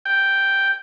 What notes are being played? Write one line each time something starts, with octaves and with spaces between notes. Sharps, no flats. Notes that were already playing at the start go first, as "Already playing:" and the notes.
G5